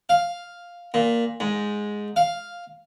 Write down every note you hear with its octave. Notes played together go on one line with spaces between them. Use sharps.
F5
A#2
G#2
F5